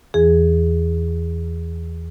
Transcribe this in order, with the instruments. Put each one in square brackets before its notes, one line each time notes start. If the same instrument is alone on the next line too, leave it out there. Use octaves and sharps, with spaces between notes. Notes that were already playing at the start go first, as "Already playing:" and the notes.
[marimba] E2 E3 G#4